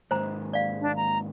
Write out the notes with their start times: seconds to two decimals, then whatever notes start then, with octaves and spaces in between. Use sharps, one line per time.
0.11 D#2 G#2 C5 A#5
0.53 D5 F5
0.81 D4
0.96 A#5